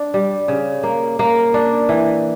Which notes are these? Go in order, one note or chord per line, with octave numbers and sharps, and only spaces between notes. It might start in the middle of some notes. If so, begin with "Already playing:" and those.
Already playing: D4
G3
C#3
A#3
A#3
D4
E3